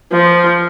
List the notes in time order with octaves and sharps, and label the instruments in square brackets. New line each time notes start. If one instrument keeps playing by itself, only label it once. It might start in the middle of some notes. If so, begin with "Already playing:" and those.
[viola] F3